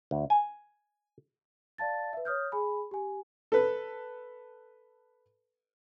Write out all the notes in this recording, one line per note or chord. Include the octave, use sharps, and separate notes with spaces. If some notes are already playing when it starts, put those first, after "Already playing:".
D2
G#5
D5 F5 A5 A6
B4 E5
C#5 D#6 F6 G6
G#4 G#5 B5
G4 G#5
A4 B4